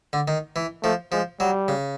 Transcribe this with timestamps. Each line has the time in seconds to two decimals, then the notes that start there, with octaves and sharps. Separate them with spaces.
0.13 D3
0.28 D#3
0.56 E3
0.84 F3 A3
1.12 F3 G#3
1.40 F#3 G3
1.68 C#3